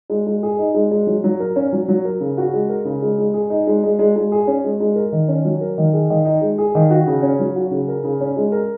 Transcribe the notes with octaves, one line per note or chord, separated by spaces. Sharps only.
G#3
G#3
G#4
D#4
G#3
G#3
F#3
F#3
A#4
C#4
F#3
F#3
A#4
C#3
F#4
G#3
A#4
C#3
G#3
G#3
G#4
D#4
G#3
G#3
G#3
G#3
G#4
C#4
G#3
G#3
A#4
D#3
C#4
F#3
A#4
D#3
G#4
D#3
D#4
G#3
G#4
D#3
F#4
C#3
C#4
F#3
F#4
C#3
A#4
C#3
C#4
G#3
A#4